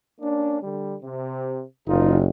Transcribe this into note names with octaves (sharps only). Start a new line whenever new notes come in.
A#3 C#4 D4
D3 G3
C3
F#1 D#4 F4